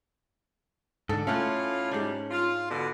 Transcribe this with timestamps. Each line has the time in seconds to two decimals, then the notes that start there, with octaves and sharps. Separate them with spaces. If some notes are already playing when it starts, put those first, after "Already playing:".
1.09 G#2 D3 A4
1.27 A2 A3 C#4 F4 F#5
1.91 G#2 G3 D4
2.31 F4
2.70 B2 D3